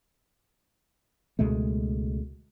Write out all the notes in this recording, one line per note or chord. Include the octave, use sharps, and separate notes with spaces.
C#2 B2 G#3 A3